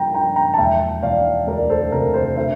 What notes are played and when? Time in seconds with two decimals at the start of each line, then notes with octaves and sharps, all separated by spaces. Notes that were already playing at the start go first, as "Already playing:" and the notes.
Already playing: G2 F3 A#3 G5 A#5
0.14 F3 G5 A#5
0.36 G5 A#5
0.54 A5
0.58 E1 E5 G5
1.02 E1 D5 F5
1.47 D2 A#4 D5
1.69 A4 C5
1.92 C3 A#4
2.14 A4 C5
2.36 D4 C5 E5